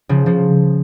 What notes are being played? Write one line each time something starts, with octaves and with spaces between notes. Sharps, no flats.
C#3 F3
C#3 F3